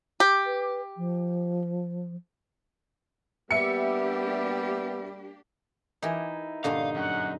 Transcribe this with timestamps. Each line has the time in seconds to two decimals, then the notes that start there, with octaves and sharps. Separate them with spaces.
0.20 G4
0.46 B4
0.97 F3
3.51 G3 A#3 B3 D4 G4 E5 C#7
6.02 E3 D#4 E4 G4 A#4
6.64 G2 A#2 D3 D#4 F5
6.95 F#2 F#5